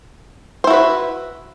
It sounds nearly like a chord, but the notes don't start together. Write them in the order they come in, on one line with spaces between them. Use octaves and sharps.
C5 E4 F#4 B4